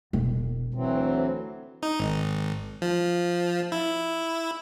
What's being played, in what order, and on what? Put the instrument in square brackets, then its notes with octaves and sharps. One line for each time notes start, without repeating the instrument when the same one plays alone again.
[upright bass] E1
[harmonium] D2 E3 F#3 C4
[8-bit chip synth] D#4
G#1
F3
E4